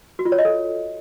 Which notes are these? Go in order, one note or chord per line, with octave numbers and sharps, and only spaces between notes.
F#4
F4
C#5
D#5
A4